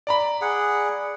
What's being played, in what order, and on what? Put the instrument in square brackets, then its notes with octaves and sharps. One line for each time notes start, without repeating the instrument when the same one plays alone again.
[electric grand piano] D5 A#5 B5
[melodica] G#4 F#5